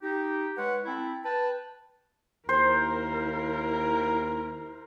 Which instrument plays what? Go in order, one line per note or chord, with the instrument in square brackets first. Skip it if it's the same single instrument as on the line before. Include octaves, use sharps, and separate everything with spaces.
[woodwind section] D#4 G4
G#3 B4 C#5 F#5
C4 E4 A4 B5
B4 G5 A5
[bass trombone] D#2 [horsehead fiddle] E4 A#4 [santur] C5